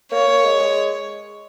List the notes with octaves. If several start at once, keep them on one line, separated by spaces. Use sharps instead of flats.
A#3 C#5
A#3
G#3
G#3